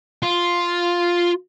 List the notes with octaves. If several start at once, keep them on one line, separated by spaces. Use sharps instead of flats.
F4